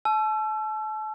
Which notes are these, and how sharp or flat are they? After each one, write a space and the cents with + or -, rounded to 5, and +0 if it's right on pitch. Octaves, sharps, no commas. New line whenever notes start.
A5 -35 E6 +30